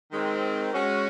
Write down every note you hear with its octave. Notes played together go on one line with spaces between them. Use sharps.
D#3 G#3 C4
G#3 C#4 F#4